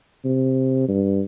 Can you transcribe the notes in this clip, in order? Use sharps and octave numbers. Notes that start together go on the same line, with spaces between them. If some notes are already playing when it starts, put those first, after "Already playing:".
C3
G2